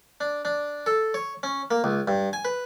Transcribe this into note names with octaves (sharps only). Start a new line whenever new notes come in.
D4
D4
A4
C#5
C#4
A#3
C#2
G2
G#5
B4